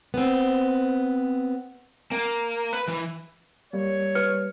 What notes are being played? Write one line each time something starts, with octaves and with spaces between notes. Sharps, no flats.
B3 C4
A#3
B4
E3
G3 A#3 C#5
B4 F6 C#7